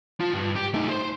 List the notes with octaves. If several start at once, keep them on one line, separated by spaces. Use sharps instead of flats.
F4 A5
G2
G4
A3 D#4
C5 C6